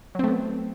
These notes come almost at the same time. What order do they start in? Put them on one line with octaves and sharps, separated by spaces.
F#3 C4 A3 B3